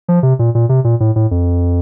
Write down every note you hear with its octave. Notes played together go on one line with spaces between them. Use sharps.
F3
C3
A#2
A#2
C3
A#2
A2
A2
F2